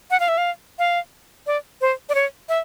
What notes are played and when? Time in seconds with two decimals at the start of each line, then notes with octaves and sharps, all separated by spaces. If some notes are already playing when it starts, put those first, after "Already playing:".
0.11 F#5
0.20 F5
0.28 E5
0.38 F5
0.79 F5
1.47 D5
1.81 C5
2.09 D5
2.15 C#5
2.49 E5